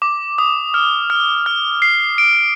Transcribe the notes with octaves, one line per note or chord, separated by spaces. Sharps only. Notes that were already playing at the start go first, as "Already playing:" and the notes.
D6
D#6
F6
F6
F6
C7
D7